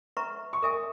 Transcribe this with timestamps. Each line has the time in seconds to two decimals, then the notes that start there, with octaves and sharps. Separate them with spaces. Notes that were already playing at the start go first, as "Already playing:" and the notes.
0.17 B4 E5 A#5 C#6
0.53 C#6
0.62 A#4 E5 G#5 D#6